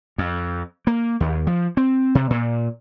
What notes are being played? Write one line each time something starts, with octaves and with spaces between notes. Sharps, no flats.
F2
A#3
D#2
F3
C4
C3
A#2